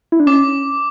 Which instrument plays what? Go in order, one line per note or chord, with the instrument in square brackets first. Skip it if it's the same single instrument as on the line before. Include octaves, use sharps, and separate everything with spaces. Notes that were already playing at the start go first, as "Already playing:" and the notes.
[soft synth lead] E4
D4
[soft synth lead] C#4 [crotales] D6